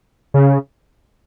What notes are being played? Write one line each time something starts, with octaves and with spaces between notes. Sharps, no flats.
C#3